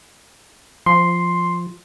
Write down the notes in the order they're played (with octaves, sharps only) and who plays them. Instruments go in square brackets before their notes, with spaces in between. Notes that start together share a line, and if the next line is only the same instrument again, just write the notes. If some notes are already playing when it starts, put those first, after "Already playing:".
[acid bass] F3 [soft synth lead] C6